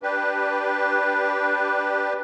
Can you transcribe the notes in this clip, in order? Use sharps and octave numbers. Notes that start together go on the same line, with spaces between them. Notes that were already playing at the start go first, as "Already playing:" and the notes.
D4 G4 B4